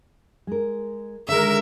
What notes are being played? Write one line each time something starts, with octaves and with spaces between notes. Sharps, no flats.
G#3 A#4
D3 D#3 G#3 A#4 D#5 E5